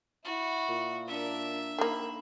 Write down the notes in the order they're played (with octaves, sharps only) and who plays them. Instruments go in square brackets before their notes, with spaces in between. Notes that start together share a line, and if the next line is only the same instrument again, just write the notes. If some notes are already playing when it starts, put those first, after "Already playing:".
[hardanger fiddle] E4 [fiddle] F#4
[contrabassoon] A#2
[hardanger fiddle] D4 A#4 [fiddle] E5
[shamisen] D#3 A#3 [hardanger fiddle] B5